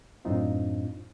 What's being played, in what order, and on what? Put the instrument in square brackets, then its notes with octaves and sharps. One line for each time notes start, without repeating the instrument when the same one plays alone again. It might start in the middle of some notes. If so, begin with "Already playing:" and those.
[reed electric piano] F#2 A2 C4 D4 D#4 F4